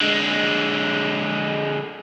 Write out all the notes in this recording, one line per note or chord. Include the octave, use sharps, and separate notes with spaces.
D3 G#3